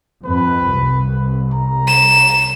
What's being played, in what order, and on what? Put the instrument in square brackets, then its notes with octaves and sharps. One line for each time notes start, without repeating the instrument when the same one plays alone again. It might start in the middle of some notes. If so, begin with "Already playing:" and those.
[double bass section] F2 [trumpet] B4
[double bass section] C2
[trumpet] A#5
[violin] E7